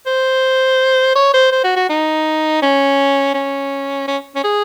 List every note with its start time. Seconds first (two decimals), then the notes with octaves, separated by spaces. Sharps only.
0.06 C5
1.15 C#5
1.34 C5
1.52 C5
1.64 F#4
1.76 F#4
1.89 D#4
2.62 C#4
3.34 C#4
4.08 C#4
4.35 C#4
4.44 G#4